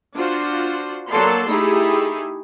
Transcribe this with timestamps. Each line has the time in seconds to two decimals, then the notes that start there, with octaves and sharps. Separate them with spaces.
0.15 D4 F4 F#4 C5
1.09 F#3 A#3 A4 D5 A5 C6
1.48 A3 D#4 E4 G4 G#4